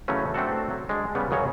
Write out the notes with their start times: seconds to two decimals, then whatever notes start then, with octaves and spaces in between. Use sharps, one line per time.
0.08 C#3 E3 F#3 A3 C#4
0.34 A3 C4 D4 F#4 A4
0.70 F#3
0.89 G#3 D4
1.15 C#3 G3 B3
1.30 G#1 F#2 C#3 F#3 C#5